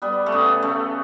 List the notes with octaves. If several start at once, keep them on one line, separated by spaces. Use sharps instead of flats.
G3 B3
A3
C#3 B3
C#3 A3